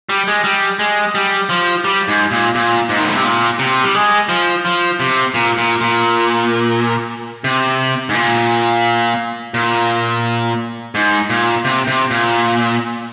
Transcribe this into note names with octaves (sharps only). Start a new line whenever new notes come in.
G3
G#3
G3
G#3
G3
F3
G3
G#2
A#2
A#2
G#2
D#3
D3
C3
A#2
C3
G3
G#3
F3
F3
C3
A#2
A#2
A#2
C3
G#2
A#2
A#2
G#2
A#2
C3
C3
A#2